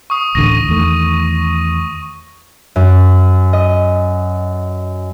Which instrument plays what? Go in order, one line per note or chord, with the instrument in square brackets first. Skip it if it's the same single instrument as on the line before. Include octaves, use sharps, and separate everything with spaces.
[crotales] C#6 D#6
[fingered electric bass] D1 A1 D3 [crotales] A#6 D#7
[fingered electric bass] E2 D#3 A3
[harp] F#2
D#5